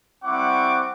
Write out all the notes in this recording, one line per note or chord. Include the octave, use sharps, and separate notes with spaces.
G3 C4 E4 F#5 C#6 D6